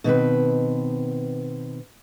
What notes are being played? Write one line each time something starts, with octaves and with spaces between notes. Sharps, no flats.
B2 D#3 C4 B4